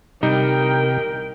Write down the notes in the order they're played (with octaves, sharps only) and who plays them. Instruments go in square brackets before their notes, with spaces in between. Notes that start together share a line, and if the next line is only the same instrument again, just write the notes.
[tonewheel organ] C3 [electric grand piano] G3 D#4 [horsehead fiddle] A#4 G5